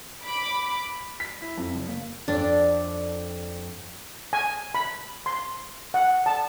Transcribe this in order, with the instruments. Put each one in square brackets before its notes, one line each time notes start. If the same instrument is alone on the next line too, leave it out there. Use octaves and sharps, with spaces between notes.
[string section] B5 D6
[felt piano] B6
E4
F2
F#1
A#3
[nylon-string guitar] F2 D5 [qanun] D4
[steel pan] G#5
B5
C6
F#5
A5